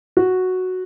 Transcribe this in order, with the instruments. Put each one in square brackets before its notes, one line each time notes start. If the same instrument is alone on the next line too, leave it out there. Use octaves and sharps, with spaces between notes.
[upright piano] F#4